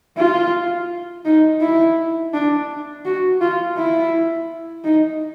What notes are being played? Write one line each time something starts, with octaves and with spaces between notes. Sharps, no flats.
F4
D#4
E4
D4
F#4
F4
E4
D#4